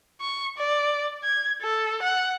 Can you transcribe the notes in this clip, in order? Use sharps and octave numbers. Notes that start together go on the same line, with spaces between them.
C#6
D5
G#6
A4
F#5